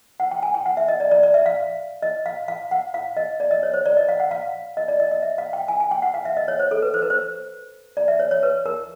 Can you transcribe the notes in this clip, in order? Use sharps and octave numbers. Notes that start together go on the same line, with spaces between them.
F#5
G5
G#5
G5
F#5
E5
D#5
D5
D5
D5
E5
F5
D#5
F5
F5
F#5
F5
D#5
D5
D#5
C#5
C5
D5
D#5
F5
F#5
F5
D#5
D5
D#5
D#5
E5
F5
G5
G#5
G#5
G5
F#5
F5
E5
D#5
C#5
C5
A4
B4
C5
B4
C5
D5
E5
C#5
C#5
B4
A#4